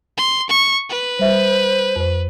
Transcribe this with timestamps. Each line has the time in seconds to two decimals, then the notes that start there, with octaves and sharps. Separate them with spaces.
0.17 C6
0.49 C#6
0.89 B4
1.19 G3 C5 E5
1.96 F2 C5